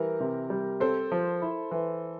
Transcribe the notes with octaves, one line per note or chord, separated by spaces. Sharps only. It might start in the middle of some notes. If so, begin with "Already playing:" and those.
Already playing: E3 G3 A#4
C3
G3
C4 A4 C5
F3
E4
E3